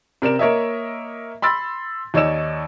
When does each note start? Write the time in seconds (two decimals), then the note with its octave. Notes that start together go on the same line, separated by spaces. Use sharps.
0.22 C3 A#4 D5 E7
0.39 A#3 A#4 C#5 D#5 E5
1.42 B5 C6 E6 A6
2.14 D#2 D#4 C#5 D5 E6 E7